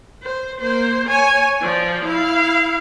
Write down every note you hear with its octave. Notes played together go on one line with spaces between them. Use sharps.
C5
A#3 C5
C#5 G#5
F3 D5
E4 F5